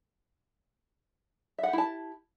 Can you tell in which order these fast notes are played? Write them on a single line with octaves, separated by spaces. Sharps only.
E5 F#5 G4 E4 A5